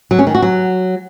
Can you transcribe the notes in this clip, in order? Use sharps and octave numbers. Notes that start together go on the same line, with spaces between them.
F#3
C#4
D#3
F#4
F#3